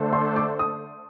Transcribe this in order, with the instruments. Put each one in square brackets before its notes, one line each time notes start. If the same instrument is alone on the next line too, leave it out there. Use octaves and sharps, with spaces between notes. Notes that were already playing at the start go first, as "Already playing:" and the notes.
Already playing: [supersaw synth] D3 A3 D4 A4 C5
[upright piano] C6
D6
D#6